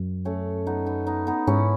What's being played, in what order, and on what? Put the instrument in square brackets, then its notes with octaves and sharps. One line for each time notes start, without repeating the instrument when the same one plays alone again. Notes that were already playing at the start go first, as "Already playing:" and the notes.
Already playing: [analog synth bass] F#2
[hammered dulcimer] A3 C#4
B3 D#4
B3 D#4
B3 D#4
B3 D#4
[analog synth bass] G#2 [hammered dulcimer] C#4 E4